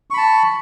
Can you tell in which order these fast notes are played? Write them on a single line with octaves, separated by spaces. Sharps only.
C#6 B5 A5